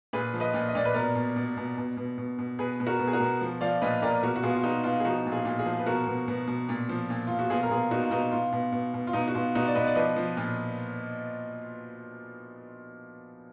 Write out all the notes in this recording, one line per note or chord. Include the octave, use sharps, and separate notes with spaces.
A#2 G#4 B4
F3
B4 D#5
A#2
D#5
A#2 D5
B4
B2 A#4 D5
B2
B2
B2
B2
B2
B2
B2
B2 G#4 B4
B2
F#4 A#4
B2
G#4
F#4 A#4
B2
F3
F3 D5 F5
A#2 B4 D#5
A#2 A#4 D5
B2 F#4 A#4
F#4
B2 F4 G#4
F4
B2 D#4 F#4
B2 F4
G#4
F3 D#4 F#4
A#2
F4 G#4
A#2
F4 G#4
F3
B4
B2 F#4 A#4
B2
B2
B2
A#2
F3
A#2
F3 F4
F#4
B2 F4 G#4
A#4
B2 F4 G#4
B2 D#4 F#4
F4
B2 D#4 F#4
B2 F4
B2
B2
B2
F4
B2 D#4
F#4
B2 F4
B2 D#4 F#4
D5
B2 B4 D#5
D5
F3 B4 D#5
F3
A#2